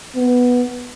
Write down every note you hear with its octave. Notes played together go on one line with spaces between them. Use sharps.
B3